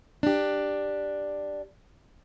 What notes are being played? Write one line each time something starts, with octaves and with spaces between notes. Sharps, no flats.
D4 G4